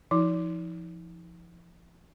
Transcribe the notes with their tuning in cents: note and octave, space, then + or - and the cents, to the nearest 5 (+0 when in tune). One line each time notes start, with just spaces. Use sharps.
F3 -25 D#4 +45